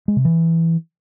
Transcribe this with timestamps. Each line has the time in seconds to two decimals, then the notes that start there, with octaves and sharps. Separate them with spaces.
0.08 G#3
0.16 C3
0.25 E3